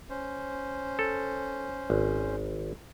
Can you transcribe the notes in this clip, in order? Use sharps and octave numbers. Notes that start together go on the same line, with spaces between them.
C#4 C5
A4
G#1